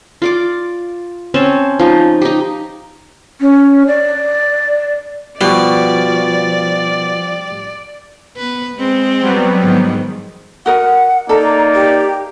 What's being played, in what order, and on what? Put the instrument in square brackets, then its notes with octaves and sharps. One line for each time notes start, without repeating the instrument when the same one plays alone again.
[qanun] F4 D5 D6
C4 C#4 C#5 A5
F3 D#4
D#4 G4
[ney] C#4
D5
[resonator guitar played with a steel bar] B2 [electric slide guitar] F3 [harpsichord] G3 [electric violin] D5
[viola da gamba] B3 B4
G#3 C4
[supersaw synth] F#3 G3 B3
[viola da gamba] G#2 D#3 F3
[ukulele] F#4 A#4 D#5 [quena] F#5
[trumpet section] A#3 D#4 D5 [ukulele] A4 [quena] A#5
[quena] G4